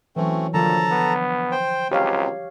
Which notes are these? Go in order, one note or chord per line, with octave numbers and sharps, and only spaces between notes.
E3 F#3 A3 C4 C#4
A#2 D3 F3 F#3 A4 A5 A#5
B3
C5 G5
C#2 F#3 C4 G4 C#5 F5